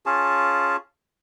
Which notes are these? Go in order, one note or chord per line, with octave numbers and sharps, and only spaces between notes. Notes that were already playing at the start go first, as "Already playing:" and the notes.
C#4 F4 G#4 A5